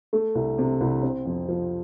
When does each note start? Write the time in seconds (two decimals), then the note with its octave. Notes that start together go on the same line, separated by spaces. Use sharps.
0.13 A3
0.35 C2
0.58 C3
0.81 C2
1.03 C4
1.26 F2
1.48 F3